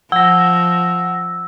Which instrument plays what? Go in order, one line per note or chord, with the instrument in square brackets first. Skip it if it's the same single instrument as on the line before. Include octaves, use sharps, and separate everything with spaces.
[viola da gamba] F3 [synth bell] F#5 A#6 [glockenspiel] E6